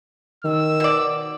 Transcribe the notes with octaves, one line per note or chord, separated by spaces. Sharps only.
D#3 E6
B2 D5